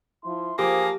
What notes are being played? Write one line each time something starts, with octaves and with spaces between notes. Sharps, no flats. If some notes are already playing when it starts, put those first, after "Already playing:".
F3 E4 C6
F3 A#3 G4 G#4